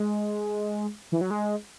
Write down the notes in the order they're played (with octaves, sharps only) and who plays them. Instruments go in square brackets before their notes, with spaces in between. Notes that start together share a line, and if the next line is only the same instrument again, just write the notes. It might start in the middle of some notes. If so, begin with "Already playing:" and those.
Already playing: [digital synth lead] G#3
E3
F#3
G#3